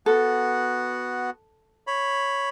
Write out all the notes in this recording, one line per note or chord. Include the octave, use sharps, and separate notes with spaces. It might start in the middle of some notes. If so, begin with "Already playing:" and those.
B3 F#4 A4
C#5 B5